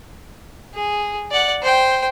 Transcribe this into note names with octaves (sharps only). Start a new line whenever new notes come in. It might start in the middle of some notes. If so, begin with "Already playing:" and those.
G#4
D5 F#5
C5 G5